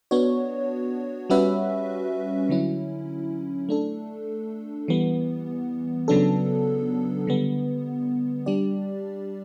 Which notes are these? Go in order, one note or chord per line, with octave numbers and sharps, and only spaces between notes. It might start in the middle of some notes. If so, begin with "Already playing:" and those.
B3 D4 F#4 C#5
G3 C#4 F#4 B4 E5
D3 F#3 C#4 E4
A3 D4 A4
E3 G3 B3
C#3 F#3 B3 D4 A4
D3 G3 B3
G3 D4 G4 D5